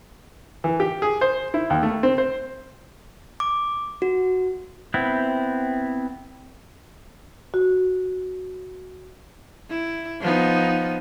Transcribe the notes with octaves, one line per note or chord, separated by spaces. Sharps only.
E3
G4
G#4
C5
E4
D#2
A3
C4
C5
D6
F#4
B3 C4 E4
F#4
E4
F3 B3 D#4